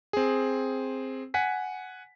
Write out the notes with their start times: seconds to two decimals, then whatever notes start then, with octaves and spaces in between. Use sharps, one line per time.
0.13 C4 G#4
1.34 F#5 G#5 B6